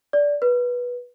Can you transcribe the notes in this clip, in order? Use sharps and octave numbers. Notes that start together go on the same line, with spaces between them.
D5
B4